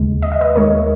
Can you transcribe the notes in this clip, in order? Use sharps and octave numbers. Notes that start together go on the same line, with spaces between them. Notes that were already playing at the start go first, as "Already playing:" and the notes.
Already playing: D#2 C#3 G#3
D#5
E5
B4 D#5
D#2 D#3 G#3 A#4 C#5